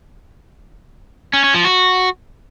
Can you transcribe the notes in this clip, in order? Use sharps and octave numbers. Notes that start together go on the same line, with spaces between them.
C#4
C#4
F3
F#4